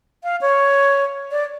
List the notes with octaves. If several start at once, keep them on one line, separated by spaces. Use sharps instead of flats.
F5
C#5
D5